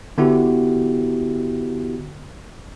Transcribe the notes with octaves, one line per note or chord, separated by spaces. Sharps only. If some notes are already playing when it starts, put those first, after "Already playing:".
D3 B3 E4 F#4 G4